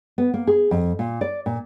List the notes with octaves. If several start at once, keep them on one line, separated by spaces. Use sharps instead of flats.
B3
A#3
G#4
F2
A#2
D5
A#2